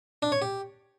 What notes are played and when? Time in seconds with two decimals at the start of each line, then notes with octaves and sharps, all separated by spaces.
0.22 D4
0.32 C#5
0.42 G4